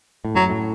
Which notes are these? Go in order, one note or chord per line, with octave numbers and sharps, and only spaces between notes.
A2
F#2 F#3
A2